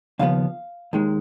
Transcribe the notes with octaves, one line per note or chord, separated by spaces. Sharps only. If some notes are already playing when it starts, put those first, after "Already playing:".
D#2 C#3 F3 B3 F5
D#2 D#3 G#3